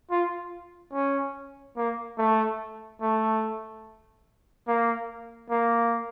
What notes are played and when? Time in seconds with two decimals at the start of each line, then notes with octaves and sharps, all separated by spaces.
0.11 F4
0.93 C#4
1.76 A#3
2.18 A3
3.01 A3
4.67 A#3
5.50 A#3